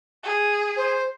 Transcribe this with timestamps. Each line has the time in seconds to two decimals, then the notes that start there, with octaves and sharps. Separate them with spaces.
0.24 G#4
0.77 C5